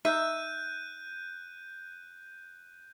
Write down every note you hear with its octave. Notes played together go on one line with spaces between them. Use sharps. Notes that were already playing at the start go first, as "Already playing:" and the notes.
D#4 E5 F#6 G6 D#7